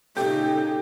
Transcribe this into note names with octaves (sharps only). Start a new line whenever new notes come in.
A#2 C#3 D#4 G4 A4